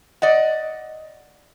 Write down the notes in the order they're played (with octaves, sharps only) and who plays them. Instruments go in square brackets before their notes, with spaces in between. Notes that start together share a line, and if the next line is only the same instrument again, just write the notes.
[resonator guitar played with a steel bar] D5 D#5 F#5